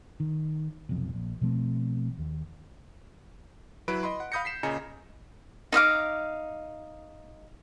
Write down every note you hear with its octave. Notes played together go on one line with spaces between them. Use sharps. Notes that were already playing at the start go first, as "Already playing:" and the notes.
D#3
F1 B1 F2
A#1
B2 F3 A3 C4
D#2
F#3 E4 B4 B5 D7
D#5 B5 C6
F#5
F5 B5 D#6 G6 A#6 C#7
B6 C7 E7
A#2 C#3 D#5 G#5 A#5 C#7
D#4 D#5 F5 D6